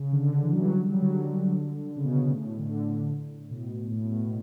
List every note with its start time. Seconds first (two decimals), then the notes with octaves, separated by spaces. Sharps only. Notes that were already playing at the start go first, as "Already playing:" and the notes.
Already playing: C#3
0.12 D3
0.43 E3
0.52 F#3
0.62 G3
0.72 F#3
0.82 G3
0.92 F#3
1.02 D3
1.96 C#3
2.04 B2
2.19 B2
2.31 A2
2.59 D3
3.39 A2
3.51 B2
3.91 A2
4.04 B2
4.12 A2
4.17 B2